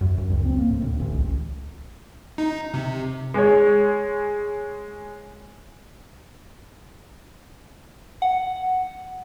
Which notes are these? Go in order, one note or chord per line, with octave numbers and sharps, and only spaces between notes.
F#2
F#2
C#2
C4
A#3
A2
D2
A1
C#2
D#4
C3
G#3 C#5
F#5